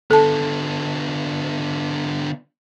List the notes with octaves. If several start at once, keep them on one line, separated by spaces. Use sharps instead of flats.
D3 B3 A4 A5